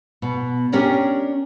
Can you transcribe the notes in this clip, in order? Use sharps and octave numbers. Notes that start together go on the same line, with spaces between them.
B2
C#4 D4 G4 A#4 C#5 D5